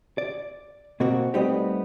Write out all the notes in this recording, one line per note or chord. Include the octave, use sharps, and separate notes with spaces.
D5
B2 A#3 C4 F#4
G3 A3 B3 C4 D#4 G4